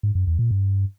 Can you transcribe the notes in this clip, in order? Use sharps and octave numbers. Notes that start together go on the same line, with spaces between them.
G#2
F#2
E2
A#2
G2